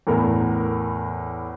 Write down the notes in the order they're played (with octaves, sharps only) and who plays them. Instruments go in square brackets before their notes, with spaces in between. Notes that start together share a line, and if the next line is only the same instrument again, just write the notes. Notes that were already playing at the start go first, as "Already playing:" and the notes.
[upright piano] E2 A2 A#4